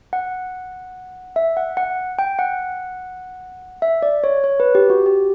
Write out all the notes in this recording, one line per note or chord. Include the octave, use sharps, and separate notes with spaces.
F#5
E5
F#5
F#5
G5
F#5
E5
D5
C#5
C#5
B4
G4
F#4
G4